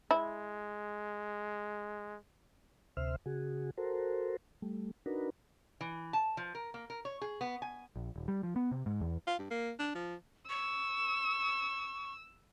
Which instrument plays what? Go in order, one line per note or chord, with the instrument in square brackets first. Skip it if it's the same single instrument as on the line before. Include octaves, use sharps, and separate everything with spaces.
[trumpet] G#3 [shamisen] E4
[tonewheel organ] D2 C3 C5 E5 F6
C#3 F#4 G#4
F#4 A4 A#4 C5
G3 A3
D4 D#4 F#4 A#4 B4
[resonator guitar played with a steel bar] E3
A5
F3
A#4
A#3
A#4
C#5
G#4
B3
G#5
[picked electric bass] A#1
D#1
G3
F3
B3
C3
G#2
E2
[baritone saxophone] F4
G2
A#3
D4
F3
[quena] C#6 [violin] E6